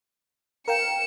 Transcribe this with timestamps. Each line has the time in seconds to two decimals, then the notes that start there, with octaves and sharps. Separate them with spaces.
0.68 A#4 F5 G5 C#7 E7